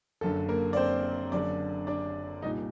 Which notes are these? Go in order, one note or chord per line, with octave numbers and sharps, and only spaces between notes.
F#1 F#2 D3 A4
A#3 A#4
D5
C4 C5
F#1 F#2 D3 D4 D5
D4 D5
C2 A#2 D#4 D#5